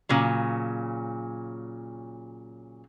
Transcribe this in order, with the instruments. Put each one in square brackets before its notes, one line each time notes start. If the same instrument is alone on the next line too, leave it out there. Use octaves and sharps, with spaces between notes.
[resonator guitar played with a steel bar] A#2 C#3 F#3